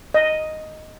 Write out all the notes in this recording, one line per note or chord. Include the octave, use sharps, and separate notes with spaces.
D#5